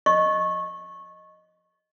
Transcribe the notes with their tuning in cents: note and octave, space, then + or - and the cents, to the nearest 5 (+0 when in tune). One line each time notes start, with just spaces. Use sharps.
D#5 +0 C#6 -20